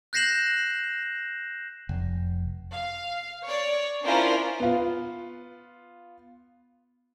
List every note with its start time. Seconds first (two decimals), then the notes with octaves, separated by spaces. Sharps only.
0.13 F#6 G6 A#6 C7 E7 F#7
1.89 F1
2.74 F5
3.46 C#5 D5
4.05 C#4 D4 E4 F4 A#4 C5
4.60 B3 F4